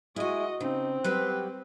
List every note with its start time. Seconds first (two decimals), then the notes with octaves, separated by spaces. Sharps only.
0.16 G#3 E4 F#4 D#5 G#5
0.60 C#3 C4 D#4
1.04 F#3 G3 G4 B4